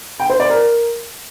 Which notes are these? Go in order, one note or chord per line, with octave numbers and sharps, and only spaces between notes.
G5
C5
D5
A#4